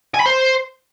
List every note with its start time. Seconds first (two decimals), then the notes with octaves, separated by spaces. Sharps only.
0.14 G#5
0.20 B5
0.26 C5